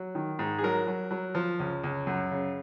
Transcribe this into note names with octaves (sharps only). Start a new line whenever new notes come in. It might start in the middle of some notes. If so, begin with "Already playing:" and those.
Already playing: F#3
D#3
G#2
G#4
F#3 A#4
F#3
F#3
F3
C#2
C#2
F#2
C#3